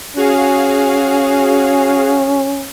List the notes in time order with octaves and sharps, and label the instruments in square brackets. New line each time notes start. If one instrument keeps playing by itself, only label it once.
[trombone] C#4 [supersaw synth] F#4 G#4 F5